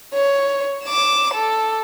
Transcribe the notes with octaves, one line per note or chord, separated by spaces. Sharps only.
C#5
D6 E7
A4